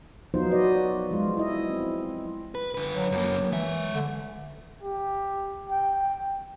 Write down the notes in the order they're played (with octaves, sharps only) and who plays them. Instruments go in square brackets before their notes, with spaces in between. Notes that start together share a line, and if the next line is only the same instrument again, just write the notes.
[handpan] F3 F#3 B3 D#4 F4 C5
F#4 B4 D5 D#5
F3 G#3 F4
E4 D#5
C4
[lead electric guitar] B4
D3 B4
[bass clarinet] F#3
[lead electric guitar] F#2 A#3
[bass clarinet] E3 [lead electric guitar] G#3 E5
[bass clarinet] D3
[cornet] G4
G5